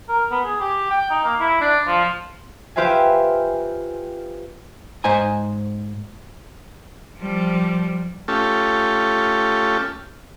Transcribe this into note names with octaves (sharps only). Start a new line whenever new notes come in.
A#4
B3
G#4
G4
G5
D#4
A#3
E4
D4
F3
F4 G4 B4 C5 E5 G#5
G#2 C5 D#5 G#5 A#5
F3 G3
A3 C#4 F4 G4 A4